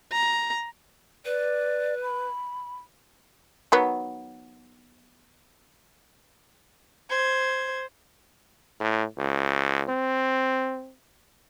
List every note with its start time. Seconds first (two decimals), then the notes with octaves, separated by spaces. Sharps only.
0.12 A#5
1.25 B4 D5
2.03 B5
3.72 D#3 F#3 B3
7.10 C5 G#6
8.80 A2
9.18 C#2
9.89 C4